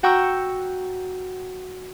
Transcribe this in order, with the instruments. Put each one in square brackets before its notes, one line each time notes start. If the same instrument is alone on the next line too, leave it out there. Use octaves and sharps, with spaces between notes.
[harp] F#4 F#5 G5 A#5 C#6 E6